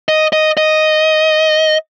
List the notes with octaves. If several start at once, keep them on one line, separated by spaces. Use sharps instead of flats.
D#5
D#5
D#5